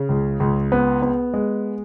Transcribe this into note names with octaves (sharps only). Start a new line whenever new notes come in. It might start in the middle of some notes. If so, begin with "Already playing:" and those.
Already playing: C#3
C#2
C#2
B3
B3
G#3